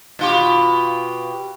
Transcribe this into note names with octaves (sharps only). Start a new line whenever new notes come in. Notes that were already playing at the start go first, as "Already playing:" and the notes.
B2 F4 G4